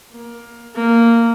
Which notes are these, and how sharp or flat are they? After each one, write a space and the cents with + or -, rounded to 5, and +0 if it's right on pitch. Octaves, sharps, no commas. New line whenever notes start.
A#3 +15
A#3 -10